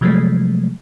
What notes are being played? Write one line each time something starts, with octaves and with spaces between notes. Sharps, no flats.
C3 F3 F#3 G#3 A3